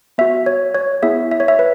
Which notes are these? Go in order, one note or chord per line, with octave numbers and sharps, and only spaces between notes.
B3 F#4 E5
C#5
C#5
B3 E4 G#4 E5
E5
C#5
E5
B4